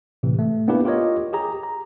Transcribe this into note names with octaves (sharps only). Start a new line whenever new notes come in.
A2 C3 E3
A3
A#3 B3 D4 E4 G4 B4
F4 G4 A#4 C#5 D#5
G4 G#4 A#5
A#5